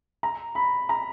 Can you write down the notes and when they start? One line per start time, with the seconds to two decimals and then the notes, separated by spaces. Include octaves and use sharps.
0.23 A#5
0.55 B5
0.89 A#5